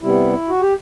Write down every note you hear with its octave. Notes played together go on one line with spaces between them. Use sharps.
C3 G3 B3 E4
F#4
G4